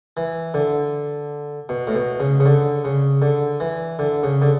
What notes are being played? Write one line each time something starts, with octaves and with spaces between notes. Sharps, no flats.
E3
D3
B2
A2
B2
C#3
C#3
D3
C#3
D3
E3
D3
C#3
D3